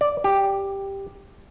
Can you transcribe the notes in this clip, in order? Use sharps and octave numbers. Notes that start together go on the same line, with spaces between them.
D5
G4